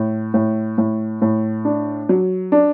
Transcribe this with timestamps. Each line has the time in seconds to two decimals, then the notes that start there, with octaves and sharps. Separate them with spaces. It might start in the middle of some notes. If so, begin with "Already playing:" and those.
Already playing: A2
0.34 A2
0.78 A2
1.22 A2
1.65 D4
2.09 F#3
2.52 D4